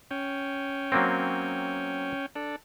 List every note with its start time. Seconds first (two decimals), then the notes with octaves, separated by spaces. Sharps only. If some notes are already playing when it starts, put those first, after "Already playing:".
0.11 C#4 G5
0.92 F#3 A#3 C4
2.36 D4 A4